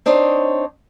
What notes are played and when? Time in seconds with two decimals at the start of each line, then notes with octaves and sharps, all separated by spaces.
0.06 C4 D4 D#4 C5 C#5